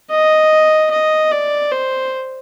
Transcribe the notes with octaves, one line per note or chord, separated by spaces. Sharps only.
D#5
D#5
D5
C5